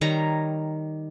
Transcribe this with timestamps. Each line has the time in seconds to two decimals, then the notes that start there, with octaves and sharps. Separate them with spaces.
0.01 D#3 G3 C#5 A#5